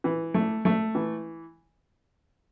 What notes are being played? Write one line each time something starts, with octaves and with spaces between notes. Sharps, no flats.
E3
A3
A3
E3